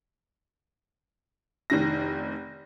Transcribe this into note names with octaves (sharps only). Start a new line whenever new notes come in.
F1 D#3 A#6